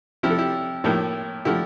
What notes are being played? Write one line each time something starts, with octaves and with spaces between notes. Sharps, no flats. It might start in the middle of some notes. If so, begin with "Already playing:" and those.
C3 F3 C4 E4 G4
A4
E4 G4
A2 F3 A#3 E4 G4
D3 F3 A3 E4 G4